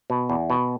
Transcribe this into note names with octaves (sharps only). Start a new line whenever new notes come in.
B2
E2
B2